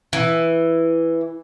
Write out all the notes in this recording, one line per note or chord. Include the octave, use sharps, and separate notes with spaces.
E3